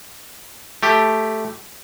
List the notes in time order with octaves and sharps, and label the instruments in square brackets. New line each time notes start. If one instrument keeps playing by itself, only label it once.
[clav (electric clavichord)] A3 G4